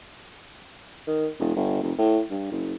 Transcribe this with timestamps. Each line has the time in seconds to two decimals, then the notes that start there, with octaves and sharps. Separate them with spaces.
1.07 D#3
1.40 E1
1.56 G1
1.83 F1
1.98 A2
2.31 G2
2.52 F#1